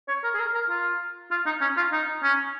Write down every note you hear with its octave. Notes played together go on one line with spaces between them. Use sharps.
C#5
A#4
G#4
A#4
A#4
F4
F4
D#4
C#4
F4
D#4
C#4